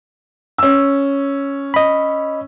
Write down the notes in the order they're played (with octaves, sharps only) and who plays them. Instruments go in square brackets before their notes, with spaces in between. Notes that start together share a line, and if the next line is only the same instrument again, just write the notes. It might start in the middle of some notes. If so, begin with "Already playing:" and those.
[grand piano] C#4 E6
[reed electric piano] D#5 B5